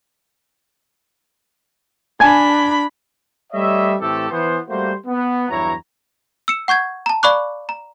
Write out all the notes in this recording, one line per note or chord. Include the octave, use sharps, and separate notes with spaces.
D4 G#5 A5 B5 G#6
G3 A3 C#5 D#5 E5
A2 E3 A3 C4 G4 A4
E3 B3 C5
G3 A3 A#3 F#4 C5
B3
E2 G2 F#3 E4 C#5 A#5
E6 C#7 E7
F#5 C#6 G6 G#6
A5 A#5
D5 F5 B5 C#6 D6 F#6
A#5